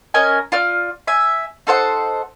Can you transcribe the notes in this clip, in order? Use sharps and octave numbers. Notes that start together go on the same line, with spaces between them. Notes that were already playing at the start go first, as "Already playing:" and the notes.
C#4 A#4 D#5 G#5
F4 D5 F6
E5 G#5
D#4 A4 C5 F#5